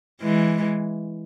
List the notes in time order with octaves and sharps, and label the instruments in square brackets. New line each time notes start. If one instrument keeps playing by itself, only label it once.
[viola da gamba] E3 G#3